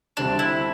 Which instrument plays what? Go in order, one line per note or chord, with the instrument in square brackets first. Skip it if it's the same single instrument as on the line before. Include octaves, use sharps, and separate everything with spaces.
[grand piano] D2 D3 G3 C4 [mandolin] D4
[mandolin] E4